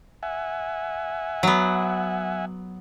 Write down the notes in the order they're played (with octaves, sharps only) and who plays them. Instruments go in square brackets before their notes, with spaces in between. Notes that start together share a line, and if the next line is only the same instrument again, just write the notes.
[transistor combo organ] E5 F#5 G#5
[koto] F#3 B3